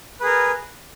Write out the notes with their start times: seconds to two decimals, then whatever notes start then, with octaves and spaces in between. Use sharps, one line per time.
0.20 B4
0.23 G#4
0.26 A#4